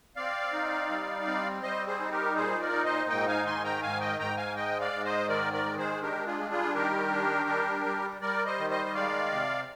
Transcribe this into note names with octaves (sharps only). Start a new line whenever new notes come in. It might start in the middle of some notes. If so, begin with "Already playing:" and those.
C4 D5 F5
D#4
G3
C4
G3 C5 D#5
G#4 C5
D#4
G4 A#4
A#2 G#4 C5
A#4 D5
D#4
C5 D#5
G#2 D#5 G5
F5 G#5
D#3 G#5 C6
G5 A#5
G#2 F5 G#5
D#5 G5
G#2 G5 A#5
F5 G#5
G#3 D#5 G5
D5 F5
G#2
C5 D#5
D#3 A#4 D5
A#4 D5
G#3
G#4 C5
D4 G4 A#4
F4 G#4
G3
F4 G#4
D#3 G4 A#4
D4
G3
G3
G3 A#4 D5
C5 D#5
D#3
C5 D#5
D#5
G#3 D5 F5
C3